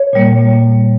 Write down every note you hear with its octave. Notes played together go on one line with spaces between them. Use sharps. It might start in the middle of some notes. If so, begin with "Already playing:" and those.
Already playing: C#5
A#2 G3 A#3